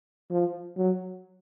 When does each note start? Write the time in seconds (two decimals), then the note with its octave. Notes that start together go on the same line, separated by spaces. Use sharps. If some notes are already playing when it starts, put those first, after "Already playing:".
0.31 F3
0.77 F#3